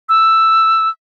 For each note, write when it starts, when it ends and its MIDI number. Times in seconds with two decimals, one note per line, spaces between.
0.09 0.89 88